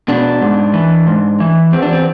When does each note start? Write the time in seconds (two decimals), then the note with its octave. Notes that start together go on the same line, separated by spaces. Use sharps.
0.08 B2 D4
0.41 G#2
0.74 E3
1.07 G#2
1.40 E3
1.72 E2 C4
1.82 D4
1.93 C4